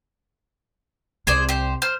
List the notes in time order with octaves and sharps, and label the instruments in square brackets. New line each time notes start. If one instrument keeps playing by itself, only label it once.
[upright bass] C2 [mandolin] G#4 C5 D5
[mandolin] G4 C5
C5 F6